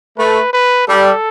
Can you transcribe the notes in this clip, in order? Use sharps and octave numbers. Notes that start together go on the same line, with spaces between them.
A3 B4
B4
G3 A4